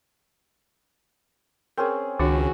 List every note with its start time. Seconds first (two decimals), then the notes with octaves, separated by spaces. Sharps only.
1.78 C4 C#4 G#4 A#4
2.19 C#2 D#3 D4 F#4